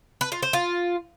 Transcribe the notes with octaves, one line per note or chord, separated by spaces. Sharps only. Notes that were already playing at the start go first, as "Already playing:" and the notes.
B4
F4
C5
F4